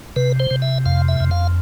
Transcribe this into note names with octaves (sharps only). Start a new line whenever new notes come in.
C3 B4
C5
C3
E5
F2 F5
E5
F2
F5